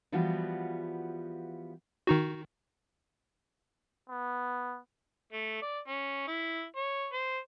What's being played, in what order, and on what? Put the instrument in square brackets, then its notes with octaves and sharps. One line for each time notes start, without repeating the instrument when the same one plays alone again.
[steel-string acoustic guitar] E3 F3 G3 B3 F4 F#4
[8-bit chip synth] D#3 D#4 F#4
[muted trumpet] B3
[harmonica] A3
D5
C#4
E4
C#5
C5